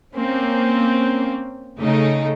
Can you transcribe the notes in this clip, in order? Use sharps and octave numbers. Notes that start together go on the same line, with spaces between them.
A#3 C4 C#4
C#3 A3 D#4